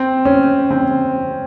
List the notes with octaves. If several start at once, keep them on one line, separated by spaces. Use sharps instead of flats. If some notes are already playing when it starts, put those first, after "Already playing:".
Already playing: C4
C#4
C4